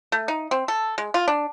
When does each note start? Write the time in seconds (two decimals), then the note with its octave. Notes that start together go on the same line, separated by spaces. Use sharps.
0.12 A3
0.28 D#4
0.51 C4
0.68 A4
0.98 G#3
1.14 F4
1.28 D4